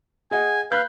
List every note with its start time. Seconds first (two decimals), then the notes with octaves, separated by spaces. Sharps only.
0.31 G#4 D#5 F#5 G#5
0.72 B4 F5 F#6 G6